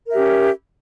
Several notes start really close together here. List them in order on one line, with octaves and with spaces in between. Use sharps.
A#4 E5 G4 C#4